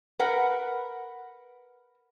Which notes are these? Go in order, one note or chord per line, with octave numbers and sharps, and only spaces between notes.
A#4 B4 F#5